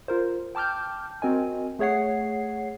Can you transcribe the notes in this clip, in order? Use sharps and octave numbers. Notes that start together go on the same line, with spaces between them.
F4 A#4 C5
G5 A5 D6 F6 G6
C4 F#4 A#4 D#5 G#5
A3 G#4 C#5 F#5 C7